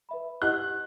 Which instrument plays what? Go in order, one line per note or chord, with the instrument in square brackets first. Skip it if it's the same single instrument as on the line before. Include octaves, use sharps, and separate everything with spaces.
[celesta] B4 E5 B5
[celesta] E4 G4 D#5 F#5 [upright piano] F#6